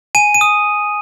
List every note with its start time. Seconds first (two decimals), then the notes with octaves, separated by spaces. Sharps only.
0.15 G#5 D#7
0.34 D#7
0.41 D#6